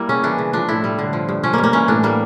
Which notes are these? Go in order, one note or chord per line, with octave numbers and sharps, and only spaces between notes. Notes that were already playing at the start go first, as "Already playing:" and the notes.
Already playing: G3 A#3 E4
C#3 C#4
E3 D4
C#3
F3 D4
A2 E4
G3
D3
F3
G2
F3 C#4
A#3
G2
A#3
E3 C#4
A2 D4
G3 A#3